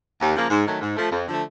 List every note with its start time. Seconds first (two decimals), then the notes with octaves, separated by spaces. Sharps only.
0.20 D#2
0.35 C#3 F3 A#3
0.50 G#2
0.66 D#3 F#3 A3
0.81 G#2
0.97 F3 A3
1.12 F2
1.28 D3 F3 A3